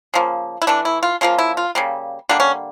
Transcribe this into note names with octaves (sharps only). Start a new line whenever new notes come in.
C#3 F3 A#3
E4
E3 A3 D4
E4
F4
C#3 F3 A#3 F4
E4
F4
C#3 G3 A#3
D3 G3 A#3 D4
C#4